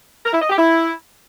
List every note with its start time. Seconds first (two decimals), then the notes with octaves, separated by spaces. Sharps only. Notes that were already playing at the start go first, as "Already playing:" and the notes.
0.24 A#4
0.32 E4
0.40 D#5
0.49 G4
0.57 E4